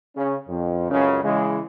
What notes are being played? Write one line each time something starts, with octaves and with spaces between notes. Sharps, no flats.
C#3 C#4
F2
C#2 F#2 C#3
C#3 E3 G#3